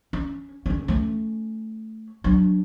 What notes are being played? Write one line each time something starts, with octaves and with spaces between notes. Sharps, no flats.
C#4
D3 C#4
A3 C#4
F#3 D4